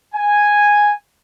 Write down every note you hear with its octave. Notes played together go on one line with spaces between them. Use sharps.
G#5